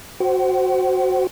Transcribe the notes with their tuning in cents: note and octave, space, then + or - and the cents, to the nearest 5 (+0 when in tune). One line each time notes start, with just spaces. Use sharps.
F#4 +0 C5 +0 F#5 +45